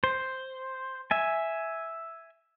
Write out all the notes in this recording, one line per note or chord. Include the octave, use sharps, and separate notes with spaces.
C5
E5 G#5